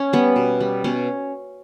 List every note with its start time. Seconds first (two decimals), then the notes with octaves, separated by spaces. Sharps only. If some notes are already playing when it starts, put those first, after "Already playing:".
Already playing: C#4
0.13 G3 B3
0.36 B2
0.61 G3
0.84 B2 C#4